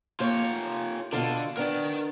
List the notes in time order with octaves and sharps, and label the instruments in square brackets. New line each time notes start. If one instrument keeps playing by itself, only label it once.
[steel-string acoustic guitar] A#3 C#5 [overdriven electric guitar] F4 G4
[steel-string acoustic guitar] B2 F4 A4 [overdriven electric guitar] D3
[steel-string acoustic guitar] B3 D4 [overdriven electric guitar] A#4 G5